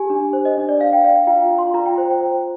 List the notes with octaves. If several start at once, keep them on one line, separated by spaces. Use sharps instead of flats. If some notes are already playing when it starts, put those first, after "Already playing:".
Already playing: G4 G#5
D4
C5
D#5
D4
D5
D5 F5
G5
D5 F5
F5
F4 G5
F4
C6
F4 A#5
G5
C5
G5
C5